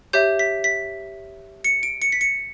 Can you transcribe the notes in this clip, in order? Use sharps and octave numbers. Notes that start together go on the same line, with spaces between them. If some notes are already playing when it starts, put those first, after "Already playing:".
G4 C#5 E5 G6
B6
B6
C#7
D7
C#7
B6
C#7